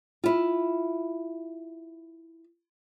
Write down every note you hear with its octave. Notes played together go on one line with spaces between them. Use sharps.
E4 F4